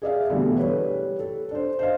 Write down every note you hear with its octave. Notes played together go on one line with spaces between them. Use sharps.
G#4 D5 E5 F5
B2 D3 E3 G3 A3 B3
G3 B4 C#5
A4
D4 C5
C5 D#5 F5